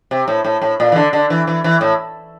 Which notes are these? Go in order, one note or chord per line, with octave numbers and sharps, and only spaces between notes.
C3
A2
A2
A2
A#2
E3
D3
D3
E3
E3
E3
A2